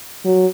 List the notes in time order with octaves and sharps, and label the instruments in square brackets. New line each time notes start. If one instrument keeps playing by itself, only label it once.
[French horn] F#3